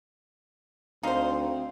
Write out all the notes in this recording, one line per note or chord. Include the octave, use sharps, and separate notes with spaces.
D2 C4 D#4 C5 F5 C6